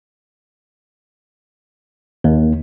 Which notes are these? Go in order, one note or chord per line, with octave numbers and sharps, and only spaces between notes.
D#2